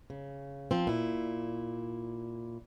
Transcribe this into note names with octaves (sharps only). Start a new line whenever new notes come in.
C#3
F3 C4
A#2 E4